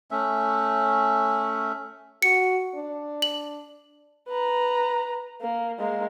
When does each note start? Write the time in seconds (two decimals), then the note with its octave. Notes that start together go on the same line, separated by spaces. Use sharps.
0.11 A3 C#4 E5
2.22 F#4 C#7
2.75 D4
3.22 F#7
4.28 B4 A#5
5.41 A#3
5.79 G#3 A#3